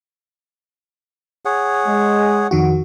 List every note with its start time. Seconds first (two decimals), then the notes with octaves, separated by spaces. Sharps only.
1.45 G#4 C#5 F#5
1.87 G#3
2.51 F2 D#3 F#4